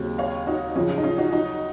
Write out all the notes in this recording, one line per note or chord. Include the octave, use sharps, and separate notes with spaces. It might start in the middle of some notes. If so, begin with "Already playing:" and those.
Already playing: D#2 C#3 F#3 C4
C#5 F5
D#4 F#4
F#2 C#3 F3 C#4 F4
C#4 F4
D#4
C#4 F4
D#4 F#4
D#4 F#4